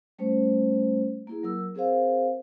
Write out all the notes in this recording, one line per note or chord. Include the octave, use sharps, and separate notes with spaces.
G3 A3 C#4 C5
A#3 E4 G#4
F#3 A#4 E6
C4 G#4 A#4 C5 F5